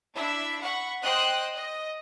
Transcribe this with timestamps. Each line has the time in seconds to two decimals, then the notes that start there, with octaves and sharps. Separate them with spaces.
0.15 D4 E4 E5
0.61 F#5 B5 C#6
1.02 C5 D#5 G5 C6 D#6 F#6
1.56 D#5